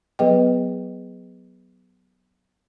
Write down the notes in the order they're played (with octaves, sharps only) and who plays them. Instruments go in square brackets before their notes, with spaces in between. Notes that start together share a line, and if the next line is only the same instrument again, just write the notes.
[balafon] F#3 B3 G#4 B4 D#5 G5